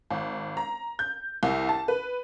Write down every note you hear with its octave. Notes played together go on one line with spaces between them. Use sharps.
G#1
A#5
G6
C2
A5
B4